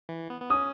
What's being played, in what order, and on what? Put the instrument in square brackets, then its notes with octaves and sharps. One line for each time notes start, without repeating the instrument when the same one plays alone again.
[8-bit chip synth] E3
B3
B3
[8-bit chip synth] C#4 [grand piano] D#6